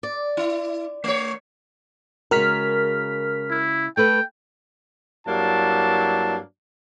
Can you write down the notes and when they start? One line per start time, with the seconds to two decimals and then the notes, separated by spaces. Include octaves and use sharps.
0.03 D5
0.37 E4
1.04 A3 C#5
2.31 C#3 G#3 F#4 A#4 F6 B6
3.50 E4
3.97 A3 A4 B4 G5
5.27 G2 F#3 A#3 D4 E4 A5